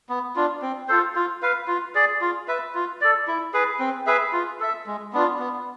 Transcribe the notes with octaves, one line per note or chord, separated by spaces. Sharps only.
B3
D4 F4
C4
F4 A4 C5
F4
B4 F5
F4
G#4 D5
F4
B4 E5
F4
A4 D5
E4
G#4 B4
C4
G#4 B4 E5
F4
A4 E5
G#3
B3 D4 F4
B3